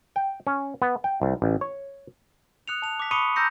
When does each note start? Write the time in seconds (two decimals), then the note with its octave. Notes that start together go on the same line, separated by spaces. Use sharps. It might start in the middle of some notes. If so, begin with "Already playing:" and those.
0.16 G5
0.47 C#4
0.82 B3
1.04 G5
1.22 C2
1.42 A1
1.61 C#5
2.68 D#6 F#6 C#7 F7
2.82 A5 F7
3.00 D6 B6
3.11 B5 C#6 D#6 C#7 D#7 F7
3.36 A#5 E6 G6 A#6 C#7